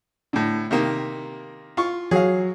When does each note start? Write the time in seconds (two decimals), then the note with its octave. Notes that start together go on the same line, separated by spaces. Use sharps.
0.33 A2 D3
0.71 C3 D#3 A#3
1.77 F4 C#6
2.11 F#3 G#4 F5